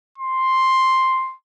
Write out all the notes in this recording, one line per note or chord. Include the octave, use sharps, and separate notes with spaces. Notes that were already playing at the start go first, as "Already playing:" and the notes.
C6